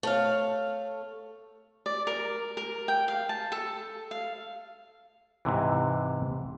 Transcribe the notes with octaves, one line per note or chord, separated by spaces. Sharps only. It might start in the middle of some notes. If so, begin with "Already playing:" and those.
A3 C#5 F5
D5
A#4
A#4
G5
F5
A5
A4
F5
G#2 C3 E3